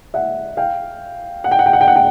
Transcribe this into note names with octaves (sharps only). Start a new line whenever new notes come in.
E5 F#5
F5 G5
F#5
G5
F#5
G5
F#5
G5
F#5
G5